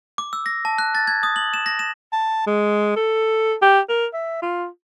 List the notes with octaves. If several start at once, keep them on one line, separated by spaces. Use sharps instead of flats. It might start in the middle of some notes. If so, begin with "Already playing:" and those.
D6
E6
A#6
A5
F#6
A6
G#6
D#6
F#7
E7
A#6
E7
A5
G#3
A4
G4
A#4
E5
F4